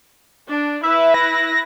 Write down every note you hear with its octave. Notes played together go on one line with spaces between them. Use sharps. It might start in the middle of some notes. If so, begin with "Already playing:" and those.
D4
E4 B4 E5
A#6